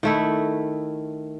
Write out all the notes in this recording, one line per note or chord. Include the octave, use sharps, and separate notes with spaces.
D#3 A3 E4